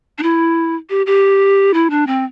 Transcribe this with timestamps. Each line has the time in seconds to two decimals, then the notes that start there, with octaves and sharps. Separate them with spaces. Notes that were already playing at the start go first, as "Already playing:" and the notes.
0.18 D4
0.23 E4
0.90 G4
1.06 G4
1.74 E4
1.90 D4
2.07 C4